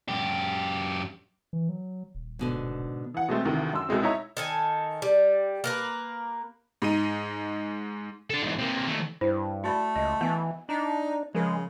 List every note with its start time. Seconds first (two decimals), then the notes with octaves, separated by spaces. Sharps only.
0.09 F#2 G4
1.53 E3
1.69 F#3
2.15 D#1
2.39 G#2 B2 D3
3.14 E3 F#5
3.28 B2 G#3 A3 C4
3.45 D2 C3 D#3 E3
3.73 F#2 C6 E6
3.89 C2 B2 G#3 C4
4.03 D#4 E4 C#5 D#5 E5 A#5
4.37 D#3 A4 G#5
5.02 G3
5.64 A#3 A#4 B4
6.82 G#2 D#4 D#7
8.30 D4 A4
8.43 E2 G#2
8.59 C3 A#3
8.87 D#3 A3
9.21 G2 E4 C5
9.64 A3 F#4 D5 B5
9.96 C#2 D#5
10.21 E3 B3 G#5 C#6
10.69 D4 D#4
11.35 C#3 F3 G#3 A#4